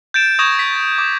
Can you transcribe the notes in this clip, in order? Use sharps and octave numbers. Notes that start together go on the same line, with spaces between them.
G6 A6 D7 E7
C#6 D#6 G#6 A#6 E7
B6
A6
D6